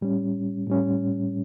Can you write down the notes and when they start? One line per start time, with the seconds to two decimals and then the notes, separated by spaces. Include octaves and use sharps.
0.01 A2 G3 C#4
0.67 A2 G3 C#4